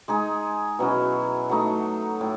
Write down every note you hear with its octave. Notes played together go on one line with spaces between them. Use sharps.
G#3 D#4 G#4
B2 F#3 C#4 E4
F#3 A3 D#4
A2